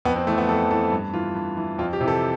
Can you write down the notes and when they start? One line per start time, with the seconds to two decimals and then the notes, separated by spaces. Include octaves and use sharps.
0.05 F2 B3
0.16 C4
0.27 E3 A3
0.38 B3
0.48 F2 A4
0.70 E3 A4
0.92 G2
1.14 E3 F4
1.35 G2
1.57 E3
1.78 F2 F4
1.93 G4
2.01 C3 E3
2.08 A4